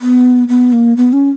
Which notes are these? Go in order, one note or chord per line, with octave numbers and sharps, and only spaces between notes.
B3
B3
A#3
B3
C#4